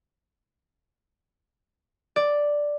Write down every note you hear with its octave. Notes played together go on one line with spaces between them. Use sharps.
D5